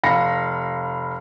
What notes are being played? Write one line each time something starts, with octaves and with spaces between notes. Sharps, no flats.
F1 F5 B5 A#6 C#7